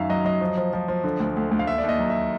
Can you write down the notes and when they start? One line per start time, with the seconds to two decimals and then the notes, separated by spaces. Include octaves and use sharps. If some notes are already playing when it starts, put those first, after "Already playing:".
Already playing: F#2 D#3 E5 F5
0.09 F#3 D#5
0.25 F#3 D#5
0.41 F3
0.57 F3
0.73 F3
0.88 F3
1.04 D3
1.20 D2
1.37 D2
1.51 D2
1.59 F5
1.67 D#2 E5
1.78 D5
1.84 D#2
1.89 D#5
1.99 F#3
2.10 E5